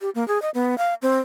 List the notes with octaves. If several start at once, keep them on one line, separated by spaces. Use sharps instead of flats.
G4
A#3
G#4
D#5
B3
F5
C4